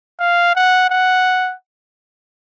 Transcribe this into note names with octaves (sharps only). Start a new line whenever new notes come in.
F5
F#5
F#5